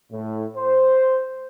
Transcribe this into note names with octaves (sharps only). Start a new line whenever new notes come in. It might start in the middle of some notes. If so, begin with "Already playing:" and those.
A2
C5